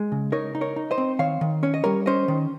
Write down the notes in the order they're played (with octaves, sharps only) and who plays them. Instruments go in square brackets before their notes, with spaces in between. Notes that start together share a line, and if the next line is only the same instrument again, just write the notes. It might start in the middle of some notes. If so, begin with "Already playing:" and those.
Already playing: [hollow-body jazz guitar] G#3
C#3
D#4 A#4 C#5
D#4
A#4 C#5
D#4
C5 D#5
C4
D#3 C#5 F5
D#3
C#4 C#5
D#5
G3 A#4 C#5
C#4 C5 D#5
D#3